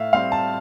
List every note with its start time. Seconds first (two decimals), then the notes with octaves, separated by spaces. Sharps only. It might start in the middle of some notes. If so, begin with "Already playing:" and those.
Already playing: A2 E5 F5
0.13 G3 C4 F5
0.32 A5